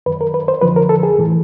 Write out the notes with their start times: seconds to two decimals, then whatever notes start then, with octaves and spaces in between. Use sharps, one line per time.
0.06 F#2 D#3 B4
0.21 A#4
0.34 B4
0.48 C5
0.62 F2 D3 F3 B4
0.76 A#4
0.89 A4
1.03 G#4
1.18 A2 E3